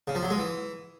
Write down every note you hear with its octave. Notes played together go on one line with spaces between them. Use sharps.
C#3
F3
F#3
G#3
E3